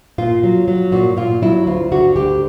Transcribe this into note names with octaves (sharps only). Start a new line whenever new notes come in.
A#2 F4
F#3
F#3
A#2 F#4
A#2 F4
F#3 E4
D2 F4
D3 F#4
D2 G4